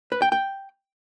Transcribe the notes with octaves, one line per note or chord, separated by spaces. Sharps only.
B4
G5
G5